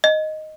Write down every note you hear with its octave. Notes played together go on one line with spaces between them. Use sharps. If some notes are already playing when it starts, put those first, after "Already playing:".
D#5